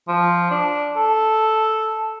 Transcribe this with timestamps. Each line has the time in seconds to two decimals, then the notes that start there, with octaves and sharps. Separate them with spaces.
0.08 F3
0.51 D4
0.96 A4